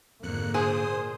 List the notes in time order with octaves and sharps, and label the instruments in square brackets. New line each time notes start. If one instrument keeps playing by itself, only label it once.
[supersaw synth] F2 F#6 C#7 [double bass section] G#2 D3 A#3
[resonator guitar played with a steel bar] A#2 G#4 [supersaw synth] C5 D#6